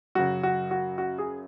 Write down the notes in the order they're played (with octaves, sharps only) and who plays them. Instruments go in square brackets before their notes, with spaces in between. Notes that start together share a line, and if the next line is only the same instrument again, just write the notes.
[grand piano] F#2 C#3 F#3 F#4
F#4
F#4
F#4
G#4